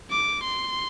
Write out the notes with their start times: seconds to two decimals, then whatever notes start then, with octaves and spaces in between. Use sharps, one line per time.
0.11 D6
0.43 C6